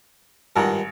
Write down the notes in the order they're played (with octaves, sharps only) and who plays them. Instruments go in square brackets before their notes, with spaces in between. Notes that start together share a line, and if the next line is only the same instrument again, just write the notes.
[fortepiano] G#1 F#5 A#5 [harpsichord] G2 D#3 F3